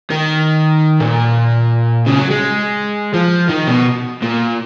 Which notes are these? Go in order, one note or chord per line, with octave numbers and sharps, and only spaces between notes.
D#3
A#2
C#3
F#3
G#3
F3
D#3
B2
A#2